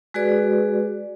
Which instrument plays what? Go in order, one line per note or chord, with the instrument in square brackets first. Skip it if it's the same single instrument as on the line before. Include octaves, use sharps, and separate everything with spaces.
[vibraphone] G#3 F#4 G#4 B4 D5